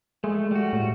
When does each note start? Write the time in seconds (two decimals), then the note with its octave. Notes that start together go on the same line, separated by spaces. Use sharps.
0.24 G#3 A3
0.51 G3 F#4
0.73 A2